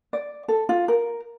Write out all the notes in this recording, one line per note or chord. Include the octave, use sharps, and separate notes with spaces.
D5
A4
F4
A#4